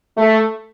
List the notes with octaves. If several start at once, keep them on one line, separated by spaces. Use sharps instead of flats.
A3